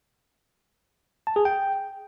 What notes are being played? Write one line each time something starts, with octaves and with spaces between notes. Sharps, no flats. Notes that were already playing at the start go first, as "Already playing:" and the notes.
A5
G#4
G5